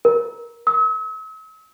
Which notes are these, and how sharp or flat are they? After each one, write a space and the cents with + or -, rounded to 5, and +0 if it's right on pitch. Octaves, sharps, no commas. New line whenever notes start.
A#4 +15
E6 -45